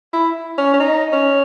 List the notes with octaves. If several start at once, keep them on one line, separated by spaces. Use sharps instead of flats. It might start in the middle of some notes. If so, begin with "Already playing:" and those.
E4
C#4
C#4
D#4
C#4